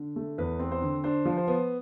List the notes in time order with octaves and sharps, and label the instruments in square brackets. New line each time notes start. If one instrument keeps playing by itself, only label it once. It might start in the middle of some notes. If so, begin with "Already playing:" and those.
Already playing: [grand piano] D3
A3
E2 B4
C4
C5
D3
D4 C5
F3
C5
B3